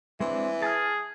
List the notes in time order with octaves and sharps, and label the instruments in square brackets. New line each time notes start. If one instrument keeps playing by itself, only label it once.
[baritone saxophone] E3 [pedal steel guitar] G#3 C4 D4
[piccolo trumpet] G#4 [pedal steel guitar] A5 F6